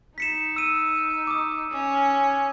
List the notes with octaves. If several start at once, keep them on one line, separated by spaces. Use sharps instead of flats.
D#4 B6 C#7 E7
E6 D#7
D6 D#6
C#4